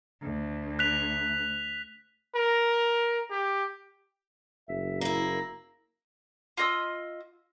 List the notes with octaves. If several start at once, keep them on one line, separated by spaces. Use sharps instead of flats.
D2
F#6 B6 F7
A#4
G4
F#1 E5
A#3 E4 A#5
F4 D#5 E6